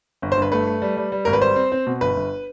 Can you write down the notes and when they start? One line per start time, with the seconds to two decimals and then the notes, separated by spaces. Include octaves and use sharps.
0.22 G1
0.32 C5
0.37 G2 B4
0.52 A3 B4
0.67 A3
0.82 G3
0.97 G3
1.12 G3
1.25 G#1 A#4
1.33 B4
1.41 G3 C5
1.56 C4
1.72 C4
1.87 B2
2.01 G1 B4
2.16 G1